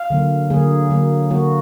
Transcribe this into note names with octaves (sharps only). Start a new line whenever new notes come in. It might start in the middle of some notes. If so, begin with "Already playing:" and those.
Already playing: F5
D3 F#3 A#3
D3 F#3 A#3 G#4
D3 F#3 A#3
D3 F#3 A#3 F#4